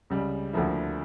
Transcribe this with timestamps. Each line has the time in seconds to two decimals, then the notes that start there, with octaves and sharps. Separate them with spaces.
0.10 C#2 C#3 G3
0.53 D2 D3 F3 A#3 E4